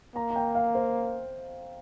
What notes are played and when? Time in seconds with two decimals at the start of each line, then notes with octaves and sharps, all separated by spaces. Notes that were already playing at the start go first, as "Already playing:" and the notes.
0.15 A#3 A#5
0.30 A#5
0.36 G5
0.55 F5
0.75 C5